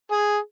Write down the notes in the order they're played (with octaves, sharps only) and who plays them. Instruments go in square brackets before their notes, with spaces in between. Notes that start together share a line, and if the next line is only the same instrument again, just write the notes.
[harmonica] G#4